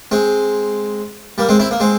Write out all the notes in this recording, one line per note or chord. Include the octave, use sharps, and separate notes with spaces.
G#3 C4
G3 A#3
G#3 C4
C4 E4
A#3
G#3 C4